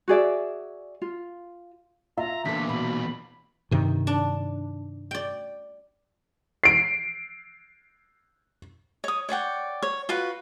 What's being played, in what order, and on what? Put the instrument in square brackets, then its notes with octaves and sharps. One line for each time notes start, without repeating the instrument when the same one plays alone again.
[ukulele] F#4 G#4 D5 E5
F4
[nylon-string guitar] F4 [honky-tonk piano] E5 [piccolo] A#5
[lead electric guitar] E2 A#2 [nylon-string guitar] D3 A4 [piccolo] B6
[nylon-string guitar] B2 [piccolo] B5
[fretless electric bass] G2 C3 D#3
[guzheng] D4
D5 G5
[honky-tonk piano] C7 D7
[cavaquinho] C#5 D#6
C#5 D5 F#5 G5
C#5
F4 F#4 B4